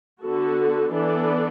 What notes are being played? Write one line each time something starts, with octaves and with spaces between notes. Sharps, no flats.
D3 B3 F#4 A4
E3 B3 D4 A4 D5